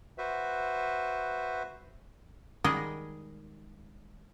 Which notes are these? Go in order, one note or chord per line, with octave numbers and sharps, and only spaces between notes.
F#4 B4 C5 E5
D#3 G3 G#3 G#4 A#4 D#5